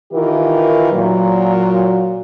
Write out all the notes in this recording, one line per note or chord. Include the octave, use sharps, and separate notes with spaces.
D#3 E3 F4 G4 A#4
A#2 F#3